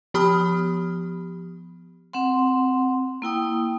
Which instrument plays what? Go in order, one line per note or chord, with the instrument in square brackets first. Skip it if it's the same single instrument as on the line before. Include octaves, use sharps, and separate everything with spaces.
[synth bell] F3 B3 G4 B5 D#6 F6
[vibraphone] C4 F#5 C6
A#3 E4 G5 D#6